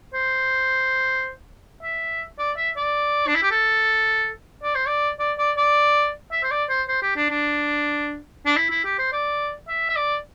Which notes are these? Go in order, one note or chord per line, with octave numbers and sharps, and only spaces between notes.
C5
E5
D5
E5
D5
D4
E4
G4
A4
D5
C5
D5
D5
D5
D5
E5
C5
D5
C5
C5
G4
D4
D4
D4
E4
E4
G4
C5
D5
E5
E5
D5